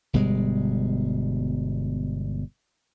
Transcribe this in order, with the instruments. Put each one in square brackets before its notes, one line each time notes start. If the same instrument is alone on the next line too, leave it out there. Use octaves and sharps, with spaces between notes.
[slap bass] G1 B2 G3 G#3